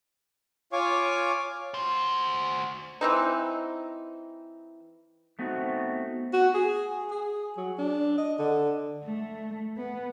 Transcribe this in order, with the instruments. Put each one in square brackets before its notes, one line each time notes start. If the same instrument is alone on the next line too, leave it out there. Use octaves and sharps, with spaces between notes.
[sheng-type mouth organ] F4 C#5 F5 G#5 C#6 D6
[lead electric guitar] F#4 C5
[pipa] E3 C4 D#4
[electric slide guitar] A3 B3 C4 D#4 F#4
[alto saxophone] F#4
G#4
G#4
F#3
D4
D#5
D3
[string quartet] A3
B3